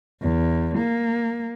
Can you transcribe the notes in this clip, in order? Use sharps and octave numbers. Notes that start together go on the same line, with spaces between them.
E2
A#3